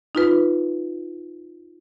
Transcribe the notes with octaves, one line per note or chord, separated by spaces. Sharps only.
D#4 F4 B4